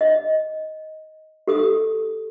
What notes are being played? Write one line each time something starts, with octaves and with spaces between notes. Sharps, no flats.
D#5
G4 A4 D#6